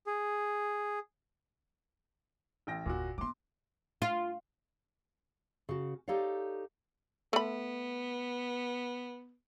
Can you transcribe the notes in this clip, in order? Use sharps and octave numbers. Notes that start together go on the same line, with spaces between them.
G#4
A1 G5 A#6
F#1 D#2 A#2 F#4
A3 B3 C6 D6
F4
C#3 F#4
D#4 G4 A4 C#5 D5 F5
A3 B3 B5